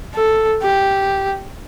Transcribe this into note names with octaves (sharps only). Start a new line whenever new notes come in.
A4
G4